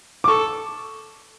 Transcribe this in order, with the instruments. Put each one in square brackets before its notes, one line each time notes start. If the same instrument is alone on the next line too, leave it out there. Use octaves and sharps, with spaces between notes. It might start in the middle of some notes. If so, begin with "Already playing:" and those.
[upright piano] D6
[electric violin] A4 [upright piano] C#6